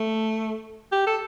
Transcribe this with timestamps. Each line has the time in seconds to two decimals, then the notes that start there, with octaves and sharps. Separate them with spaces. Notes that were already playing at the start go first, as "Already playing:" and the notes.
Already playing: A3
0.92 G4
1.07 A4